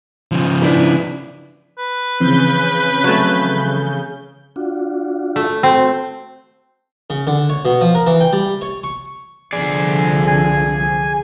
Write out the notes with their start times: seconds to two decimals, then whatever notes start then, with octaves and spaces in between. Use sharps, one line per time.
0.32 C#3 F3
0.62 D4 E4 B4
1.78 B4
2.20 C#3 E3 F3 C4 G6
3.04 F#3 A3
4.56 D4 F4 F#4
5.36 A3
5.63 C4 F#4
7.10 C#3
7.27 D3
7.49 C#5
7.65 B2
7.81 F3
7.95 A#4
8.07 E3
8.20 G5
8.33 G3
8.61 C#5
8.84 C#6
9.53 C2 D3 F3 G#4 D5
10.27 G#5